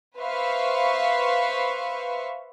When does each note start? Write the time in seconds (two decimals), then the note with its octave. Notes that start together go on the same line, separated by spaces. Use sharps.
0.18 B4 C5 E5 F5 C#6